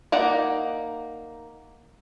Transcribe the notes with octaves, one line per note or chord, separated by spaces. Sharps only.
A#3 D#4 D5 F#5